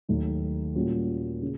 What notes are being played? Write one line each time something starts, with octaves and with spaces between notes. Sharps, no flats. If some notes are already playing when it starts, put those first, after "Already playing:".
D#2 D#3 F#3 A3
A#2 G3 A#3 C#4 F#4
C#3